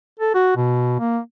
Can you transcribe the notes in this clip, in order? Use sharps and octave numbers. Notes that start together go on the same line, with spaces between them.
A4
F#4
B2
A#3